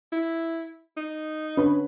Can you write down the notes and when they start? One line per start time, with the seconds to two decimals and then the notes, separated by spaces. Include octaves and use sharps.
0.12 E4
0.97 D#4
1.57 D3 C#4 B4